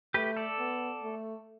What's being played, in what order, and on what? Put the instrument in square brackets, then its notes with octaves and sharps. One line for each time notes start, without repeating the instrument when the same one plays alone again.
[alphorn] A3 [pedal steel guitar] G4 B4
[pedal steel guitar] A4 D5
[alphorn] B3
A3